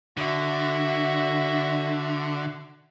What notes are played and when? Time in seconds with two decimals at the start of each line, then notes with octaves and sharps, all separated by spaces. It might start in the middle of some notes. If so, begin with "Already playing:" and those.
0.17 D3 F#4 E5